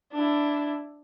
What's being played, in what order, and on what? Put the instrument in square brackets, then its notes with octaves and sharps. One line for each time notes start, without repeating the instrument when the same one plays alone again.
[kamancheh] D4 E4